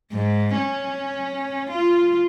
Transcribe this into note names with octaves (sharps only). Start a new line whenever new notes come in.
G#2
C#4
F4